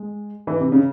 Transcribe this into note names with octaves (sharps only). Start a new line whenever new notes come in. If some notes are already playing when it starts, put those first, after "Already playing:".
Already playing: G#3
E3
C3
C#3